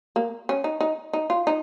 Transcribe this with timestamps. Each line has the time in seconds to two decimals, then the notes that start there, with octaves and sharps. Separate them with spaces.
0.16 A#3
0.49 C#4
0.64 D#4
0.81 D#4
1.13 D#4
1.30 F4
1.47 D#4